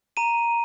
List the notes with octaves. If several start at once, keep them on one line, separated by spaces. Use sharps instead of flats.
A#5 D#7